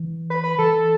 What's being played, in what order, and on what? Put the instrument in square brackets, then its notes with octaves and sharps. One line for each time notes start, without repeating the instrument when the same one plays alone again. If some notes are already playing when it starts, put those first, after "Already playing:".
Already playing: [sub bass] E3
[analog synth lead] B4
B4
[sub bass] E3 [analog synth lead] A4